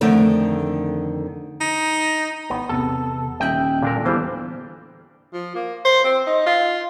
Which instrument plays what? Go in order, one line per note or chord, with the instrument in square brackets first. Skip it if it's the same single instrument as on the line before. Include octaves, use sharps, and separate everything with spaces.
[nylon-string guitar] F2 D3 D#3 A3 D4
[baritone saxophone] D#4
[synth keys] A1 [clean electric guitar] B3
[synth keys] E2 C3 B3 [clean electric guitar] A4
[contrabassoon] D#1 [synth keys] D#5 E5 F#6 [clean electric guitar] G5
[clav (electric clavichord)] A#2 D4 A#4 [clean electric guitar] D3 A4
[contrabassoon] E2 [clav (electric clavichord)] E3 G3 [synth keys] F4 C5 F5
[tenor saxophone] F3
A#3
C5
C4
D#4
F4